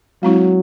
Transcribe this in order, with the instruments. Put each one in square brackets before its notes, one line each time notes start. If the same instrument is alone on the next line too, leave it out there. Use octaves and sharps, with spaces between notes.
[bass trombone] F#3 [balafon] G#3 C4 E4